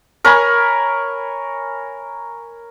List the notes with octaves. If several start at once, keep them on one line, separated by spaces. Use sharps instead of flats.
A#4 C#5 G#5 B5